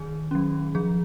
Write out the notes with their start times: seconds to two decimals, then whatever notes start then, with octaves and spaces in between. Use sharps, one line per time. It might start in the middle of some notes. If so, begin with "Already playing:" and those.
Already playing: D#3 G#4
0.31 F#3 C#4
0.75 F3 G#4